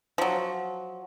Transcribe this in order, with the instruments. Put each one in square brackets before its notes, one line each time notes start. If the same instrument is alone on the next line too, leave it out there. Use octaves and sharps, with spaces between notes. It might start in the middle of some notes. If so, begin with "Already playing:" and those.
[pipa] F3 F#3